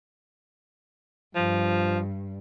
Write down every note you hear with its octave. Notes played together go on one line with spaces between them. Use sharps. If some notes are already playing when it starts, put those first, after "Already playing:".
G2 F3